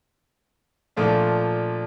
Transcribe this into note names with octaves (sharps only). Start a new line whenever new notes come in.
A#2 F3 A3 D4